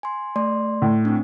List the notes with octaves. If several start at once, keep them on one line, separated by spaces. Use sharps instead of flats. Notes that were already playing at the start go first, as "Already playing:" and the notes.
G#5 C6
A3 D5 C6
A2
C4 D4